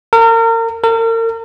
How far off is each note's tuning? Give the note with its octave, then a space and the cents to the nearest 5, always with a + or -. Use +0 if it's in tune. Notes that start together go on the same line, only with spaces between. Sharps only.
A#4 -35
A#4 -40